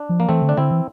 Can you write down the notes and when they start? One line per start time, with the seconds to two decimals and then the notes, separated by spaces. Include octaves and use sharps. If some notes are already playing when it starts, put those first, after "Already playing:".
Already playing: D4
0.09 F3
0.20 A#3
0.29 E3 A3 C4
0.42 D3
0.49 D4
0.57 D3 C4 E4
0.71 E3